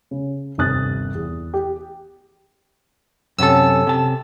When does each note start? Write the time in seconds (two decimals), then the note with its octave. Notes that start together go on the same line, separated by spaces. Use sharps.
0.11 C#3
0.58 G1 D#2 C3 D#6 F#6 A6
1.15 E2
1.54 G4
3.38 F#2 C3 C#4 A4 E6
3.87 C3 A5